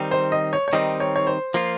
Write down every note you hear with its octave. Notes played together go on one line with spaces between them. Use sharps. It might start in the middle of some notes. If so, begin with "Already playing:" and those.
Already playing: D#3 G3 C4 D#4
C5
D#5
C#5
C#5
D#3 G3 C4 D#4 D#5
C#5
C#5
C5
F3 A#3 F4